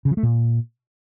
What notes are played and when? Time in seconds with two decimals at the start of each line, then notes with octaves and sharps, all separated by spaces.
0.05 C#3
0.11 F3
0.17 A3
0.23 A#2